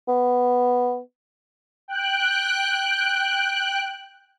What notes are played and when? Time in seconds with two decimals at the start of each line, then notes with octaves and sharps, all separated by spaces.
0.08 B3
1.88 G5 F#6